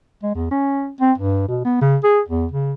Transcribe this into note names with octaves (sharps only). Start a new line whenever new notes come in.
G#3
E2
C#4
C4
G2
B2
B3
C#3
G#4
E2
C#3